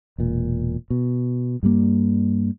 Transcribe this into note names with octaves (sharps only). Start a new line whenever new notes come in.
E1 A#2
B2
G2 G3 A#3